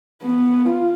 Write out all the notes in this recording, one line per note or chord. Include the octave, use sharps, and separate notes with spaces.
B3
F4